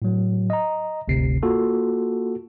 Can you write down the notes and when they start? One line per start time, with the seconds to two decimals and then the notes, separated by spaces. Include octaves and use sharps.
0.02 A2 F#3
0.50 D#5 A#5
1.08 G1 D2 C3 C7
1.43 A#3 F4 F#4 A4